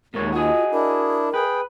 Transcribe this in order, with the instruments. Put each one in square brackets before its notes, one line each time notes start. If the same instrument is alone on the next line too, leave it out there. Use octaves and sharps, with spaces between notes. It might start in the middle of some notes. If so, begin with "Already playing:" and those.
[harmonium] D#2 [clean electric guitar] A#2 G#3 C#5 [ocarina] A#4
[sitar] G#3 D#5 [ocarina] F4 [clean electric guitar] F#4 G#4
[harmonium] D4 E4 [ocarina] A#4
[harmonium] G#4 G5 [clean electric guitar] B4